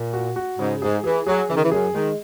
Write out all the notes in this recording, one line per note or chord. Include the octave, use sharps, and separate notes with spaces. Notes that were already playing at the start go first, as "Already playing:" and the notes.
Already playing: A#2
F#4
F#4
G#2 C#3
G#2 G#4
E3 G#4
F#3 G#4
C#3 E3
D#3
E3
F#2 G#4
D#3 G#3